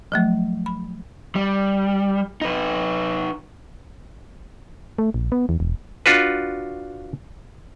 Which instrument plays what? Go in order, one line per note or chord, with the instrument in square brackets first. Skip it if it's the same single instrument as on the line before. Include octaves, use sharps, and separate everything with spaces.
[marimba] F3 F#3 A3
B5
[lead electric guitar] G3
D#4 B4
[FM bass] A3
A#1
B3
E2
E1
[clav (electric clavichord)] D4 F4 F#4 B4